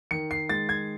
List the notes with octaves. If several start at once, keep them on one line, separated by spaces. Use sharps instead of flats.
D#3 C#7
C7
G#3 A6
G#6